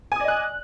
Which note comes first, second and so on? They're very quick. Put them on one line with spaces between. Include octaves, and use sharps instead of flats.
G#5 D#6 D5 D#5 F#6